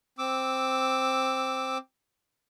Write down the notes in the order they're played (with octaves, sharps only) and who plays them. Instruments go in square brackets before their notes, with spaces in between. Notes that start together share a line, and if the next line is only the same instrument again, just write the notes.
[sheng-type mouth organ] C4 D6 E6